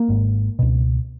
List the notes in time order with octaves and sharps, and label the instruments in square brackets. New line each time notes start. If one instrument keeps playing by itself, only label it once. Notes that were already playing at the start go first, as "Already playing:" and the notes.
Already playing: [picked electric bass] A#3
G#1 G#2
C#2 B2